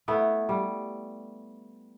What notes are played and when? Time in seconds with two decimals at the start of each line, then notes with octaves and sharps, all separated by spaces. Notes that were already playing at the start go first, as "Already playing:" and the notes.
0.08 A3 B3 E4
0.49 G3